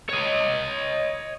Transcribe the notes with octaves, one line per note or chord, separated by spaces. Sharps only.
C#5 D#5